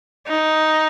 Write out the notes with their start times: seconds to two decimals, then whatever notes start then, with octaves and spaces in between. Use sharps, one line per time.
0.28 D#4